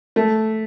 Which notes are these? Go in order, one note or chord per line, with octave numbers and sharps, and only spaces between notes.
A3